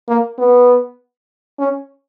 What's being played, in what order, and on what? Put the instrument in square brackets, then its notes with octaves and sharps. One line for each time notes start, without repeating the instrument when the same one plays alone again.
[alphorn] A#3
B3
C#4